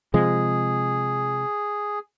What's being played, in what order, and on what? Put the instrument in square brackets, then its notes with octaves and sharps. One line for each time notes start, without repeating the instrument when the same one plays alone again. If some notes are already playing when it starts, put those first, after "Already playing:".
[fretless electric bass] C3 F3 G#3 [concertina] G#4